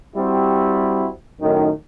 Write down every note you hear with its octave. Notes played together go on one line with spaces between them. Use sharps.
G3 C4 E4 F#4 G4
F#2 A2 D#3